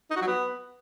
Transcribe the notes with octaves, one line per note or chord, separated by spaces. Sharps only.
D#4
F#4
F#3
B3